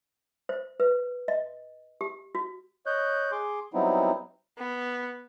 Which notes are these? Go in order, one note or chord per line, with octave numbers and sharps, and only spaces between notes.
C5
B4
D#5
G4
F#4
C#5 D#5 F#6 G6
G#4 C6 D6
F#3 G3 B3 C4 D#4 E4
B3